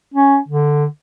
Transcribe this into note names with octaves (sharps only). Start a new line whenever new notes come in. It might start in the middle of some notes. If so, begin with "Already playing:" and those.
C#4
D3